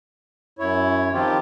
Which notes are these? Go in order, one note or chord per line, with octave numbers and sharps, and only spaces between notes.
F#2 E4 C#5
D#3 F3 C4 F4 G4